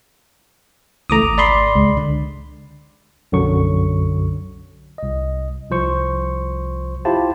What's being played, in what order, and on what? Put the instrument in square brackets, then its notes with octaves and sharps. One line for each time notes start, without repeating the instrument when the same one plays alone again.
[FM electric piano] C#2 E3 A3 [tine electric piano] A#5 D6 D#6
[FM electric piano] G#1
[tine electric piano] D5 B5 C6
[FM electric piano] C#2 G#3
D3
[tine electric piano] B1 F#2 D3 F#3 C#6
C2 D#5
C2 F3 C5 C#6
E4 F4 G4 C5 A5